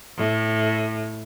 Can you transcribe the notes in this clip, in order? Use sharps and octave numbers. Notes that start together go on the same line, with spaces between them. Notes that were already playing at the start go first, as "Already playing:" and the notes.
A2